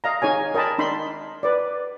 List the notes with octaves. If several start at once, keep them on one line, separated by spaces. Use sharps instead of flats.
D#5 F5 A#5
D#4 G#4 C#5 G#5
A#4 D#5 G5 A5 B5
D4 D#4 B5 C6
B4 D5